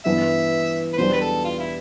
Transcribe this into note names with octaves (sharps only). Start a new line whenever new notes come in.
G2 E3 B3 E5
B4
E2 B2 G3 B3 D4 C5
B4
A4
F4
E4